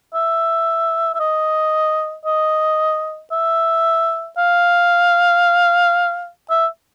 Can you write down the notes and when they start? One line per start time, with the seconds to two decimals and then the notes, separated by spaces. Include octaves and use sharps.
0.14 E5
1.14 E5
1.20 D#5
2.26 D#5
3.32 E5
4.38 F5
6.50 E5